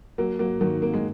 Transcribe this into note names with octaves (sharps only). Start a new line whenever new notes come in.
F#3 A#3
F#3 A#3
D#3 F#3
A#3
G#3